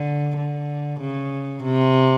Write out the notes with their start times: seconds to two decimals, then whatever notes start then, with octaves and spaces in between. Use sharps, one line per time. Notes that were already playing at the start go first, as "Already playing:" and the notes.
Already playing: D3
0.37 D3
1.00 C#3
1.63 C3